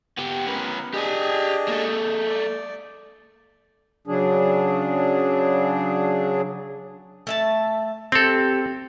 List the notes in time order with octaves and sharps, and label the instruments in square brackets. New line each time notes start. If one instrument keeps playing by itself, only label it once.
[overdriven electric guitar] B3 G4
[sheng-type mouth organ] B3 A#4 [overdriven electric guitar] C#4 B4
[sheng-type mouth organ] D4 G#4 D#5 [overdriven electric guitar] G4 G#5
[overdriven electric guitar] A#3 A4
[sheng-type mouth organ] D5
[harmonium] C#3 F#3 D4 G#4
[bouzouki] A3 E5 A5
[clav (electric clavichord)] C4 A4 [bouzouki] G4